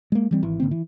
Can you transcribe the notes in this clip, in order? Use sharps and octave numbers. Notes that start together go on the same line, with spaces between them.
G#3 A#3
E3 G3 C4
G#1 E3
G#1 D3 A#3 C4
E3